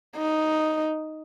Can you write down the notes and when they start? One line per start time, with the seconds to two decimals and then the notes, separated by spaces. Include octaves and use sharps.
0.17 D#4